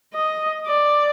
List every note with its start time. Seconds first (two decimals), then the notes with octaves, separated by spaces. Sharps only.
0.14 D#5
0.67 D5